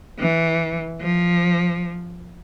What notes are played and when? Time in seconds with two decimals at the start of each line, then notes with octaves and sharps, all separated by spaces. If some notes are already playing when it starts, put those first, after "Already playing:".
0.19 E3
1.01 F3